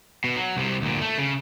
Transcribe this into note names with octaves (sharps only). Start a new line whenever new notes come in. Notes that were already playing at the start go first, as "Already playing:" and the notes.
B2
F#3
C2 C3
D2 A#2
A3
C#3